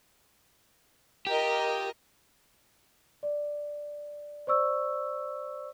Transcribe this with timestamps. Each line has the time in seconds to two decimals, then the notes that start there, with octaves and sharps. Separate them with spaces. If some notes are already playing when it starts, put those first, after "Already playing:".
1.27 F4 G4 A#4 D#5
3.23 D5
4.47 C5 D5 C#6 E6